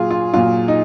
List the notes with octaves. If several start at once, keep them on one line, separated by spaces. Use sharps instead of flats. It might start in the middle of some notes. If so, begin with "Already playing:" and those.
Already playing: A#2 F#3 F4 G#4
F4
A#2 F#3 F4
D#4